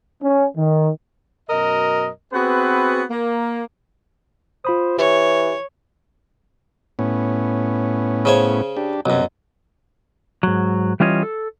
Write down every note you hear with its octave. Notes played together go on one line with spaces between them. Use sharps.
C#4
D#3
F#2 B2 A#4 D#5
B3 C4 F#4 G#4 B4
A#3
F4 C5 B5 D#6
E3 G4 C#5
A2 B3 C#4
C#3 C5 C#5
D4 G4
B1 F#2 C3
G#2 F#3
E3 G3 C#4 F4 C#5 D#5
A4